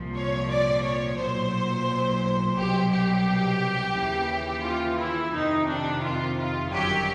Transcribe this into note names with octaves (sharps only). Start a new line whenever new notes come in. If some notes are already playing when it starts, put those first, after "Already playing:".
Already playing: C2 A#2 F3
C#5
D5
C#5
B1 A#2 F#3 C5
C2 B2 F#3 G4
G4
D#2 C#3 E3
F4
E4
F2 C3 D#3 D#4
D4
F4
F4
G1 F#2 D#3 F#3 G4